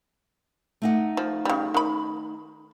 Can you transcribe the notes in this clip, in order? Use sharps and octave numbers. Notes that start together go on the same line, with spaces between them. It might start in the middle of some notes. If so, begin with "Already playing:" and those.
A3 D#4 F#5
F3
C#3 G3
D#3 B5